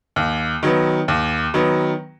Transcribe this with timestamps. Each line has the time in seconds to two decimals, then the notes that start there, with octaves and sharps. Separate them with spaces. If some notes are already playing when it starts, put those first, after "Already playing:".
0.16 D#2
0.63 D#3 F#3 B3
1.08 D#2
1.54 D#3 F#3 B3